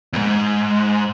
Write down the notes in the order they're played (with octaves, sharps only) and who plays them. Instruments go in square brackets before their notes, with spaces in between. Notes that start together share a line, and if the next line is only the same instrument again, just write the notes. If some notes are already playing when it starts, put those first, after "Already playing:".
[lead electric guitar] E2 G#2